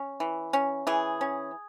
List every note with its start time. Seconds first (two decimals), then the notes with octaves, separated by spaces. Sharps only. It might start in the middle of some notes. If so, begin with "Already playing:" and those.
Already playing: C#4
0.20 E3
0.53 C#4
0.87 E3 G#4
1.21 C#4